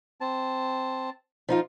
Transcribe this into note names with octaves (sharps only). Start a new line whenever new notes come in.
C4 A5
F3 D#4 F4